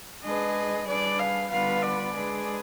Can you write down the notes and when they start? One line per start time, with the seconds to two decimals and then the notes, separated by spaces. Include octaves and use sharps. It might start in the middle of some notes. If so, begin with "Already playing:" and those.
0.24 G#3 D4 G#4 B4 D#5
0.87 G3 D4 G#4 B4 D5
1.19 F5
1.50 D3 G3 B3 F4 B4 F5
1.82 D5
2.13 G#3 D4 G#4 B4